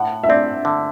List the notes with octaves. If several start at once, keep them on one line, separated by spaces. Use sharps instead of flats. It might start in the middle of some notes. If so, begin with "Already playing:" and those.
Already playing: A2 F#5
E5
C4 D5
D3